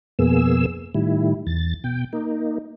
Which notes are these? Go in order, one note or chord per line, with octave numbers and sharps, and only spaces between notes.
F2 B2 A#3 B3 G#4 E6
A2 D#3 G3 E4
E2 A6
B2 G5
A#3 D#4